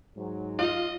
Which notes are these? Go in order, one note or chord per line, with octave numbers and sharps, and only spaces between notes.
G#2 F#3
F4 D#5